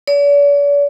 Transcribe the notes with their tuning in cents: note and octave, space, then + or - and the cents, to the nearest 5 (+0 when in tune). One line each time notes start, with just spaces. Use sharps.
D5 -45